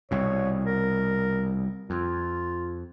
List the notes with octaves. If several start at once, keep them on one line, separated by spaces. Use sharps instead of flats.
C2 B2 C#5
A#4
F2 F4